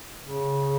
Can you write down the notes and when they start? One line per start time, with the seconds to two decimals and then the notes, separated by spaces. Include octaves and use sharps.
0.23 C#3